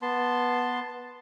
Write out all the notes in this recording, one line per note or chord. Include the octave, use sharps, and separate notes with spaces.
B3 A5 C6